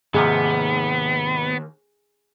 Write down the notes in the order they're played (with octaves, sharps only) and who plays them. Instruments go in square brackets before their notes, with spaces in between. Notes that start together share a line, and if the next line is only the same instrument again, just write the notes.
[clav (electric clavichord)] G#2 C3 F3 [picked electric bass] D#3 A#3 [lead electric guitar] B3 [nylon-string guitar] G#4